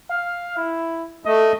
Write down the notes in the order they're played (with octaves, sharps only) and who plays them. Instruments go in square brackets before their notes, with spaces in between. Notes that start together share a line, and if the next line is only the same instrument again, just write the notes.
[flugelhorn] F5
E4
[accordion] A3 [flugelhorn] D#5